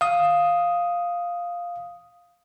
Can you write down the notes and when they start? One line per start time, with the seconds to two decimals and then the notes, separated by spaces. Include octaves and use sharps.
0.01 F5 D#6